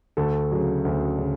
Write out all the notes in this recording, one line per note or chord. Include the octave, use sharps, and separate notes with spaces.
D2 A4
C#3 F#3
D2
C#3